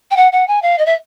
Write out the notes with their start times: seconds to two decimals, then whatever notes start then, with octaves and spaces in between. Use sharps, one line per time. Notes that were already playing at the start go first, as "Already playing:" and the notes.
0.11 G5
0.17 F#5
0.32 F#5
0.48 G#5
0.62 F5
0.78 D#5
0.86 E5